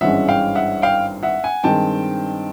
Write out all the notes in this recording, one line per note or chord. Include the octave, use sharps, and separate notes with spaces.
G#1 G2 E3 G#3 C#4 E5 F#5
F5 G5
E5 F#5
F5 G5
E5 F#5
F#5 G#5
G2 D#3 G#3 C4 G5 A5